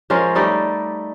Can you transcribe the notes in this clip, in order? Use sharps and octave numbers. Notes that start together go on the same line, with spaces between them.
F3 G#3 C#4 A#4
G3 A3 D#4 D5